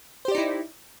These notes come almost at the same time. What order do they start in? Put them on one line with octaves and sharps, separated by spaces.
C5 G4 D5 D#4 E4